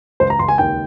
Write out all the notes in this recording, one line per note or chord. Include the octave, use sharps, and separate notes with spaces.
C#2 C5
A#5
C#2 C6
G#5
D#2 G5